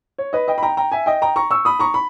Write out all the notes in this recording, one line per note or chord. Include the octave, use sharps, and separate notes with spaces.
C#5
B4 D#5
D#5 G5
B5
G5 A#5
G5 A#5
E5 G#5
D#5 G5
G5 A#5
A#5 C#6
C#6 E6
B5 D#6
A#5 C#6
B5